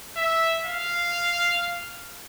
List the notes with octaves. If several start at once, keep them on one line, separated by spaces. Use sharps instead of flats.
E5
F5